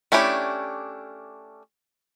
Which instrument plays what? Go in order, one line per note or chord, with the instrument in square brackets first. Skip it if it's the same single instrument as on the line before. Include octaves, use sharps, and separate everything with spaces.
[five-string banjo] A3 C#4 D4 E4 G4